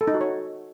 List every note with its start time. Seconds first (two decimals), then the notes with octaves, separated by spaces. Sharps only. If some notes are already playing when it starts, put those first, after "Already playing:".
0.01 A4
0.07 D#4
0.14 F#4
0.21 C#5